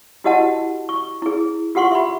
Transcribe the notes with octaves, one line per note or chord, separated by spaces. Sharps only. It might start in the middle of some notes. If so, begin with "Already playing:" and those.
E4 F#4 G4 D#5 F#5 A5
C#6
E4 G#4
F4 G4 F#5 C6 C#6
E5 B5